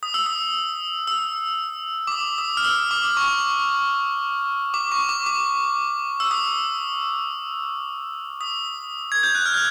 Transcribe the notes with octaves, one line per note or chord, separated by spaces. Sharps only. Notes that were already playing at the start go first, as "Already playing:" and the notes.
D#6
E6
D#6
E6
D6
D#6
D#6
F6
E6
D6
C#6
D6
C#6
D6
D6
E6
D#6
D#6
G#6
G6
F#6
F6
G6